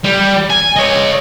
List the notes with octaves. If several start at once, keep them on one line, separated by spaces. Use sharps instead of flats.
G3
G#5
C#5 D#5